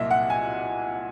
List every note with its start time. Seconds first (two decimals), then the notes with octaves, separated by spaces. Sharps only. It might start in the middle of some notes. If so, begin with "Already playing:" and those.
Already playing: C2 A#2 F#3 A#3 D#5 E5
0.11 F#5
0.30 G#5